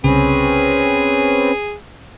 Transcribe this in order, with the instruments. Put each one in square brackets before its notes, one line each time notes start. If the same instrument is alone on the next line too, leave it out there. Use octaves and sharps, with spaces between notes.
[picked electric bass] C2 C#3 [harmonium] C4 C#4 B4 [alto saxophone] G#4